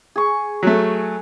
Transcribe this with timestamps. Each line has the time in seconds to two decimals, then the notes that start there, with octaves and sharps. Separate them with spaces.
0.16 G#4 C#6
0.63 F#3 A3